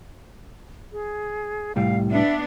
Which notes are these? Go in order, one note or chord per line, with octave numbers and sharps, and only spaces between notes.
G#4
C2 A2 G3 F5
B3 D4 E5